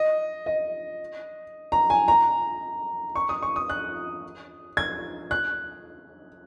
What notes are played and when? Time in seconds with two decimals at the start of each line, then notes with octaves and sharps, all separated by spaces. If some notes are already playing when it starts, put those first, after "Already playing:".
Already playing: D#5
0.46 D#5
1.72 A#5
1.90 G#5
2.08 A#5
3.16 C#6
3.29 D#6
3.42 C#6
3.56 D#6
3.69 F#6
4.77 G#6
5.31 F#6